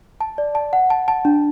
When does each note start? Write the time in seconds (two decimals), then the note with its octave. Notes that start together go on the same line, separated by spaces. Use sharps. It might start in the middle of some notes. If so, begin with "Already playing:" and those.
0.21 A5
0.38 D5
0.55 A5
0.73 F#5
0.90 A5
1.08 A5
1.25 D4